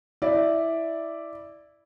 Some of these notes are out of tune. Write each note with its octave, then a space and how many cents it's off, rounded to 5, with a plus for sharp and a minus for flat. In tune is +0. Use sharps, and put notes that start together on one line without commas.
E4 -5 D5 +0